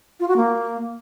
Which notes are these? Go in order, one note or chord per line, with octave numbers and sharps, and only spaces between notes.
F4
F#4
A#3